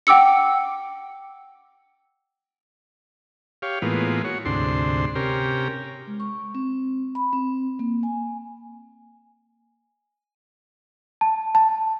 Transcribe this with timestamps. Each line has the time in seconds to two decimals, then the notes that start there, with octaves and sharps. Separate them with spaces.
0.07 F#5 G5 D6 E6 C#7
3.62 G4 C#5 F5
3.82 A2 E3 G#3 A#3 B3 F4
4.24 F#4 C#5
4.45 D2 G#2 C3 D4 C6
5.15 C3 C#4 G4 A#4
6.07 G#3
6.20 C#6
6.55 C4
7.15 B5
7.33 C4
7.79 A#3
8.03 G#5
11.21 A5
11.55 A5